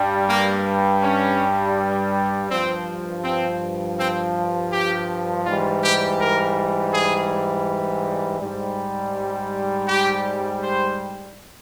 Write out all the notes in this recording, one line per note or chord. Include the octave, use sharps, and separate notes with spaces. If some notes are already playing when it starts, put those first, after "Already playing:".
Already playing: G2 G3
A#3
C#4
G2 F3 C4
C4
C4
G4
G#2 E3 G3 F4
G4
A#4
G#4
G#2 G3
G4
C5